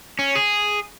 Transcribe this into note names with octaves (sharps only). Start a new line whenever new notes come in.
C#4
G#4